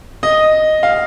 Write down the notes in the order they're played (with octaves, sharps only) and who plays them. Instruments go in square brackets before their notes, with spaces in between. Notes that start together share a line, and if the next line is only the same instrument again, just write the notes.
[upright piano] D#5
F5